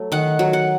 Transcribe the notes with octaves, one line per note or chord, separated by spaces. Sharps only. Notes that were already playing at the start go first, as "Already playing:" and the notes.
Already playing: F#3 A3
D#3 F#5
F#3
F#5